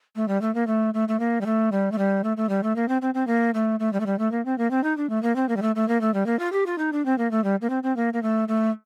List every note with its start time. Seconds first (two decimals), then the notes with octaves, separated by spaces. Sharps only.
0.16 A3
0.28 G3
0.41 A3
0.55 A#3
0.67 A3
0.94 A3
1.08 A3
1.19 A#3
1.41 G3
1.46 A3
1.72 G3
1.92 A3
1.98 G3
2.24 A3
2.37 A3
2.49 G3
2.63 A3
2.76 A#3
2.88 C4
3.02 C4
3.14 C4
3.27 A#3
3.54 A3
3.80 A3
3.93 G3
4.00 A3
4.06 G3
4.19 A3
4.32 A#3
4.45 C4
4.58 A#3
4.71 C4
4.84 D#4
4.97 D4
5.10 A3
5.23 A#3
5.36 C4
5.49 A#3
5.56 G3
5.62 A3
5.75 A3
5.88 A#3
6.01 A3
6.14 G3
6.26 A#3
6.39 F4
6.52 G4
6.66 F4
6.78 D#4
6.92 D4
7.05 C4
7.18 A#3
7.31 A3
7.44 G3
7.61 A#3
7.70 C4
7.83 C4
7.96 A#3
8.13 A#3
8.23 A3
8.48 A3